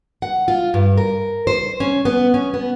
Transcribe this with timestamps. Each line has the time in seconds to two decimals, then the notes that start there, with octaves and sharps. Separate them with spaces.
0.22 F#5
0.48 F4
0.74 G2
0.97 A#4
1.47 C5
1.80 C#4
2.05 B3
2.34 C#4
2.54 B3